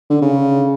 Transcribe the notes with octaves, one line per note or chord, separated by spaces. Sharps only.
D3
C#3